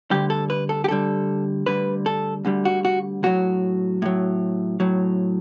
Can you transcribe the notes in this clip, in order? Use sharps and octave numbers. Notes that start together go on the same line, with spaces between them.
D2 D3 G3 G4
A4
B4
A4
G4
D2 D3 G3 A4
D2 D3 G3 B4
A4
D2 D3 G3
F#4
F#4
A2 F#3 F#4
A2 F#3
A2 F#3